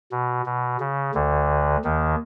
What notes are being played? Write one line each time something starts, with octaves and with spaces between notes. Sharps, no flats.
B2
B2
C#3
D2 D3
D#2 D#3